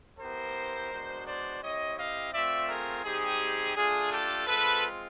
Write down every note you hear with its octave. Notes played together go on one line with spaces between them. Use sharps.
B3 E4 G4 A#4 C5
G#3 B3 D4 F#4
C5 D5
C4 E4 G4 C#5 D#5
D#5 F5
A3 C4 F4 D5 E5
G#4 A#4
G3 C4 D#4 G4 G#4
A3 D4 F4 G#4
G4 A4
G#3 C4 F4 A4 B4